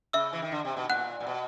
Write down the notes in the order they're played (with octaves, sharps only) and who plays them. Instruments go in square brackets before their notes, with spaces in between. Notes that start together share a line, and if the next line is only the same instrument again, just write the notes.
[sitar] C#3 [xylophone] E5 E6
[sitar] E3
D#3
D3
C3
B2
[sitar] A#2 [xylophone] F#5 F#6
[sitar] A#2
B2